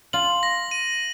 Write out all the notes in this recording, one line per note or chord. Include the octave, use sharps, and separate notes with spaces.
F4 F#7
A#6
D#7